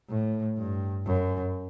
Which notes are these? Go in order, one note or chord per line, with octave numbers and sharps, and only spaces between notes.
A2
G2
F#2